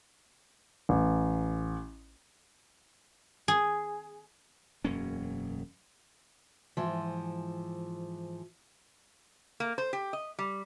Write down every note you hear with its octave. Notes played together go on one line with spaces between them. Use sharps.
A1
G#4
E1 F#2 A#3 C#4
G#2 E3 F3
A#3
C5
G4
D#5
G3